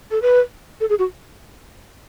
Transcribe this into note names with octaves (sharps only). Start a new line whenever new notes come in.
A4
B4
A4
G#4
F#4